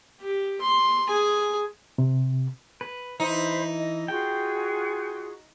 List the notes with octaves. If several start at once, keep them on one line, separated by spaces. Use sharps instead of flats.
G4
C6
G#4 G#5
C3
B4
E3 D#4 C5 B5
D#5
F4 F#4 G#4 G5